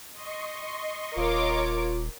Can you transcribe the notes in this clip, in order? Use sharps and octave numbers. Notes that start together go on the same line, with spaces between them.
D#5 C6 C#6
D#1 F4 A#4 C#5 D6